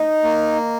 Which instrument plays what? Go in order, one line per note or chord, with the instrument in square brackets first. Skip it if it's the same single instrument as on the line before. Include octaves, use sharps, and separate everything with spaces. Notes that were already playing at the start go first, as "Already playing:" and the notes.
Already playing: [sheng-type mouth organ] D#4 [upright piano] D#5
[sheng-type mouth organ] A#3